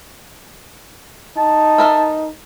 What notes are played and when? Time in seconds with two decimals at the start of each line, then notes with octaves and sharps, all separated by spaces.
1.37 D#4 A5
1.78 A4 A#4 E5